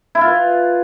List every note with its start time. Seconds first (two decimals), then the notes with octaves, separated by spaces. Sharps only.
0.15 E4
0.21 F4
0.27 B4